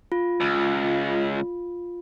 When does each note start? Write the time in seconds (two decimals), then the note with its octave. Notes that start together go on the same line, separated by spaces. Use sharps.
0.12 F4
0.40 C#2